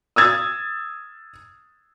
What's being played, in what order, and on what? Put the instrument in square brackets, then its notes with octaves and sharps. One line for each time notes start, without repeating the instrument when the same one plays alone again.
[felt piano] D#6 E6 G#6 A6